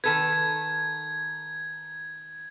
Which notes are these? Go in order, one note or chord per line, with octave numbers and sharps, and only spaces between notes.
D#3 A4 B4 G#6